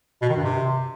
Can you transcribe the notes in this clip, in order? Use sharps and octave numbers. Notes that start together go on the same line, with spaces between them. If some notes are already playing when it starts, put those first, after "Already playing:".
B2
D#3
G2
C3